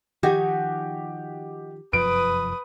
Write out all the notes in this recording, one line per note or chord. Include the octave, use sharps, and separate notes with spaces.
D#3 F3 D#4 F#4 G4 G#5
F1 F#2 F3 B4 D#6 D7